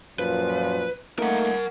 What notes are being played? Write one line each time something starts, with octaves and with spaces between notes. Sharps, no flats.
F#2 A#2 F3 B4
A3 A#3 D#4 A#4 F#5